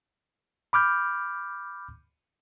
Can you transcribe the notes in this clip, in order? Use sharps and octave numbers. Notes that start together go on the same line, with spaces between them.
B5 D6 F6 G6